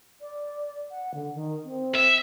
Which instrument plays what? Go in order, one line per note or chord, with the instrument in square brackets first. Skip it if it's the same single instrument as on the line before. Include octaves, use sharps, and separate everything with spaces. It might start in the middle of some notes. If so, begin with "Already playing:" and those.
[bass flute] D5
F#5
D3
D#3
C4
[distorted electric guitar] E5